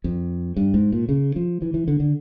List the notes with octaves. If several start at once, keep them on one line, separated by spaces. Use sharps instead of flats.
F2
G2
G#2
A#2
C#3
F3
E3
E3
D3
D3